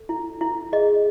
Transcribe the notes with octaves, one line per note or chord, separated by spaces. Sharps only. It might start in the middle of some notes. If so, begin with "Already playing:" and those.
Already playing: A4
E4
E4
G#4 D#5